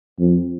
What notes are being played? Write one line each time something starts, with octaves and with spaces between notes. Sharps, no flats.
F2